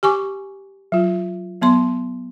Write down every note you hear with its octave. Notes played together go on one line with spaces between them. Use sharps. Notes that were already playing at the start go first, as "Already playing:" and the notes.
G4 G#5 C#6 D6
F#3 F4
F#3 B3 C6